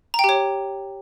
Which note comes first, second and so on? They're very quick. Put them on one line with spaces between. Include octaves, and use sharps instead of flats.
A#5 G5 G4 C#5